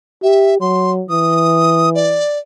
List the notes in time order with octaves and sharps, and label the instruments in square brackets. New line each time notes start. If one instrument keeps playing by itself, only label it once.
[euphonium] G4 [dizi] E5
[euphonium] F#3 [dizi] C6
[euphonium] E3 [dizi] D#6
[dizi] D5